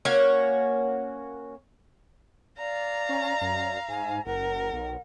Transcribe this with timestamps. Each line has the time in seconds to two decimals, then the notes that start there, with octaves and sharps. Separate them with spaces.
0.05 A#3 C#4 F#4 C#5
2.58 D5 F5 A#5
3.09 C#4
3.41 F#2
3.88 G#2 G#5
4.26 F#1 A#4 F#5
4.73 B1